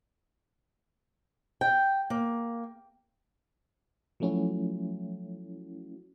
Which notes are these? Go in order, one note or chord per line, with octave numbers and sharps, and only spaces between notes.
G5
A#3
F3 F#3 A3 C#4 E4 F#4